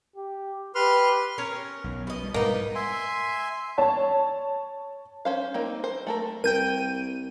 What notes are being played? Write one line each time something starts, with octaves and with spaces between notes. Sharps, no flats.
G4
G4 B4 C6 F6
C#4 A#4 C#5
B1
B2 D#5
G3
G#2 B2 G3 A#3 B3 D#4
E5 G#5 C6
C#5 A5
C#4 C5 F5
A#3 C4 D#4
C5
A3 A4 A#4
C2 A#4 G5 G6 D#7